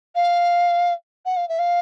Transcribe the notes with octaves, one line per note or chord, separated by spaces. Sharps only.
F5
F#5
F5
E5
F5